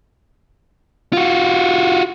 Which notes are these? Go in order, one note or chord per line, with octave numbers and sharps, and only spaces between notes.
F4 F#4